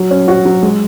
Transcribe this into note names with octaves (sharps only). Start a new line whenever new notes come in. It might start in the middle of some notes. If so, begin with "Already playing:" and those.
Already playing: F#3
C#4
F#4
F#3
G#3